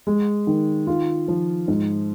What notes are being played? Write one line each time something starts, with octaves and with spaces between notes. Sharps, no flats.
G#3
D#3
F4
F3
G#2